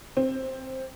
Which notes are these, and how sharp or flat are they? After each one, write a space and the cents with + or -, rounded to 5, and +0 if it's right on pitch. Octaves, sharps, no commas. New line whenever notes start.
C4 +10